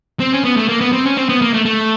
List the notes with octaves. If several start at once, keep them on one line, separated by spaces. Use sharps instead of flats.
C4
C#4
B3
A3
A#3
B3
C4
C#4
C4
B3
A#3
A3
A3